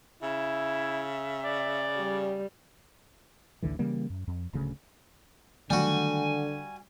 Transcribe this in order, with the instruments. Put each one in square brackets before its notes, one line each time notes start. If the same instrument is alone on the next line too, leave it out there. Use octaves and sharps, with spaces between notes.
[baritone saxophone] C#3 [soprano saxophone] E4 [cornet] E5
[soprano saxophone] D5
[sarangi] G3
[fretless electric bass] A1 D2 D3 E3
C#3 E3 G3 A#3
F#2
F2
D1 D2 C#3
[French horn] D3 [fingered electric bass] D#3 F#3 A3 [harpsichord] G3 F#4 [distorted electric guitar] G#5